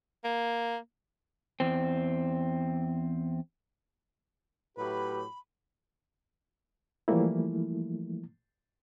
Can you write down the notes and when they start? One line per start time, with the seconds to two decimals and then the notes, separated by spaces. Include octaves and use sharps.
0.25 A#3
1.60 E2 C4
4.77 A2 F#3 G4 B4 B5
7.08 E3 F3 G3 A3 A#3 E4